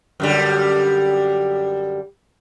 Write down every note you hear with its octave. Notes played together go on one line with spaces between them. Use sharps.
F#2 D3 G3